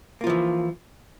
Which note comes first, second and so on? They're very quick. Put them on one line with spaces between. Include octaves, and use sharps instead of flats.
A#3 F4 F3 E3